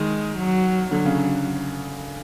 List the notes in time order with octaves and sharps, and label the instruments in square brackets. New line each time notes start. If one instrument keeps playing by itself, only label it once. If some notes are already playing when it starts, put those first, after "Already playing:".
Already playing: [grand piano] D#3 [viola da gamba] G#3
[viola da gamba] F#3
[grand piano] D3 [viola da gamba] F#3
[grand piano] C#3